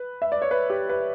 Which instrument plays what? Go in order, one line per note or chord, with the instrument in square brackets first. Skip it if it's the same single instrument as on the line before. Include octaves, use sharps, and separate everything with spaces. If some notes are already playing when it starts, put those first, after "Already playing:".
Already playing: [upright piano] B4
E5
D5
C#5
B4
G4
B4